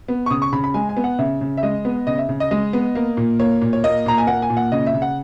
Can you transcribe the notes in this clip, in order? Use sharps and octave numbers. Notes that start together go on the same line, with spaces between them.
B3
C#6
C#3 D#6
C#6
C#3 B5
B5
G#3 G#5
G#5
B3
F#5
C#3 E5
C#3
E5
G#3 D#5
B3
C#3 D#5
E5
C#3
D#5
G#3 D#5
B3
A#3
A#2
A#3 C#5
A#2
C#5
A#3 D#5
A#2 A#5
G#5
A#3 F#5
G#5
A#2
F#5
C#3 D#5
E5
C#3
F#5